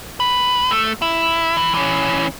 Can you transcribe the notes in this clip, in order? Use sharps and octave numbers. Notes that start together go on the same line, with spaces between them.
B4
A3
E4
E3
E3 C#4